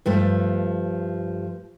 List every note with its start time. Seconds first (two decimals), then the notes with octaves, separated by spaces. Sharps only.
0.06 G2 F3 A3